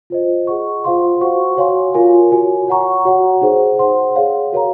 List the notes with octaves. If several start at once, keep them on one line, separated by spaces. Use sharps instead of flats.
F4 C5 D#5
G#4 D#5 F#5 C#6
F4 C5 F5 C6
F#4 C5 F#5 C#6
F#4 C#5 F5 G#5 C6
F4 A#4 C#5 G#5
F#4 C#5 G#5
C#5 F#5 A#5 C#6
F#4 C#5 F#5
D#4 G#4 C5
C5 F#5 C6
G#4 C#5 F5
F#4 A#4 C#5 F5 A#5